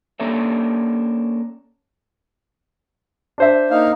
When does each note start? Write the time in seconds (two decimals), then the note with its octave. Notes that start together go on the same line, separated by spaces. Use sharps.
0.20 A#3 C#4 D4 A4 C#5 E5
3.38 D4 C5 E5
3.71 A#3 D#4 F5